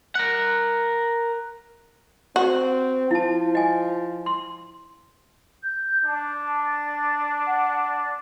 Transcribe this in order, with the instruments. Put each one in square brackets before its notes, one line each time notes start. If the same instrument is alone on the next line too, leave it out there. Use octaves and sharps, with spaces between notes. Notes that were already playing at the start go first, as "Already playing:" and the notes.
[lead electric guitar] A#4 F#5
[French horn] C4 [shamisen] F#4
[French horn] F3 [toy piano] E4 A5
[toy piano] D#5 G#5
C6
[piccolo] G6
[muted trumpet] D4 [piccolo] A5
[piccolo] A6
F#5
A6